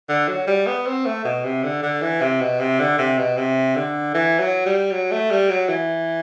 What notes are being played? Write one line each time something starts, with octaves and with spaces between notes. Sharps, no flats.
D3
F#3
G3
B3
C4
A3
B2
C3
D3
D3
E3
C3
B2
C3
D3
C3
B2
C3
D3
E3
F#3
G3
F#3
A3
G3
F#3
E3